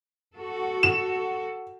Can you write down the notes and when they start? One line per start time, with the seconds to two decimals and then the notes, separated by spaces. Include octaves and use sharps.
0.37 F#4 A4
0.83 E7